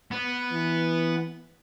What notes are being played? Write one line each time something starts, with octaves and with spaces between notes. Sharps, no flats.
B3
E3